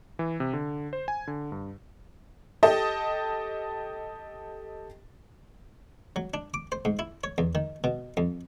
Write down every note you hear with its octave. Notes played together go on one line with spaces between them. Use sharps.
E3
C3
D3
C5
G#5
D3
G2
G4 A4 D#5 A5
F#3
D4
D6
C5
G#2
E4
C#5
E2
D#3
B2
F2